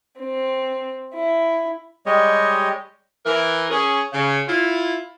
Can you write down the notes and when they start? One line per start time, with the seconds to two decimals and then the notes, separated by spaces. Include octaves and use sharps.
0.19 C4
1.15 E4
2.06 G3 G#3 G4 C#5 D#5
3.26 E3 A#4
3.70 C#4 G#4
4.12 C#3
4.47 E4 F4